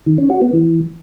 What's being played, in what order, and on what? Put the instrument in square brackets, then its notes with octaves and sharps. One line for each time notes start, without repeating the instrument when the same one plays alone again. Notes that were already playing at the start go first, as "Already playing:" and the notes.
[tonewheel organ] D#3
C#4
F#4
B3
E3